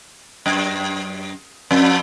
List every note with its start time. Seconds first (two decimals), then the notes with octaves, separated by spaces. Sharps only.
0.46 F#2
1.71 F2